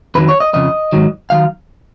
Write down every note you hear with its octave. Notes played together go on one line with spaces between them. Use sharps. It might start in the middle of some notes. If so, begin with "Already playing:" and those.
F2 D#3 F#3 B4
C#5
D#5
F2 C#3 F3 D#5
G#2 D#3 F#3
D#3 F#3 F5